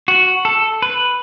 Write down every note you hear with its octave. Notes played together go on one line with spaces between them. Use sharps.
F#4
A4
B4